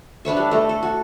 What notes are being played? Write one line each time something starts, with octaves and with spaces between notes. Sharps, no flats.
D4 B4 C#5 E5
G3
A3 A#5
A4
F#4